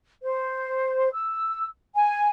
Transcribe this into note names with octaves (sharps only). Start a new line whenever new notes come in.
C5
E6
G#5